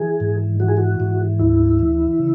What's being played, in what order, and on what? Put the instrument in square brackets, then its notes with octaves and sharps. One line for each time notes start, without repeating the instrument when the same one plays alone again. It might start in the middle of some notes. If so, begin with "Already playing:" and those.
Already playing: [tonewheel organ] E3 G#4
G#2
E3 F#4
G#4
F#4
G#2
D2 E4
E3
C#3